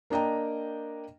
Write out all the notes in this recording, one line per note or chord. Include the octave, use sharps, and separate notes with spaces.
A#3 D4 D#5 G5 A#5